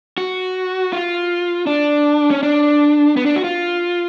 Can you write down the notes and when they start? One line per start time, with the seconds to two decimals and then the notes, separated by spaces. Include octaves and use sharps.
0.18 F#4
0.93 F4
1.67 D4
2.31 C#4
2.43 D4
3.17 B3
3.26 D4
3.36 F#4
3.44 F4